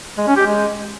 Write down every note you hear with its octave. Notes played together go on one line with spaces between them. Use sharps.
G#3
C#4
G4
G#3